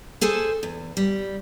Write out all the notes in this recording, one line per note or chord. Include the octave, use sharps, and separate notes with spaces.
G#4 A4 C5 G#5
E2
G3